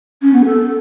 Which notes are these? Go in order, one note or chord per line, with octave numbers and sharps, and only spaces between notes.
C#4
B3
A4